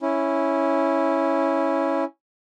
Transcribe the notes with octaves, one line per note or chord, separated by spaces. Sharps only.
C#4 E4